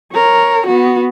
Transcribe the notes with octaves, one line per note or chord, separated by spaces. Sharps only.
A#4 C#5
B3 F#4